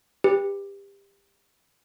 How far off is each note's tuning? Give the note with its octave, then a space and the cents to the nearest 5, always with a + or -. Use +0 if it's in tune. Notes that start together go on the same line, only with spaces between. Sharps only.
G4 +25 B4 +0